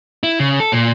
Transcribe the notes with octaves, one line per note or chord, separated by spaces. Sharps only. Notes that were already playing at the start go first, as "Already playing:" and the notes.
E4
C#3
A4
A#2